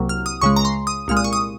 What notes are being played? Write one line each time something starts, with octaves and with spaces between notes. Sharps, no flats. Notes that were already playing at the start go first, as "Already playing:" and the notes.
Already playing: C2 C3 F#3 A#3
F6
D#6
C#2 C#3 G#3 C#6
A#5
C6
D#6
C2 A#2 G#3 F6
D#6
C#6
D#6